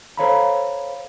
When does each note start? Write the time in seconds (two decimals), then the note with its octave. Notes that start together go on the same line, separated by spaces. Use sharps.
0.17 A4 C5 C#5 F5 A#5 B5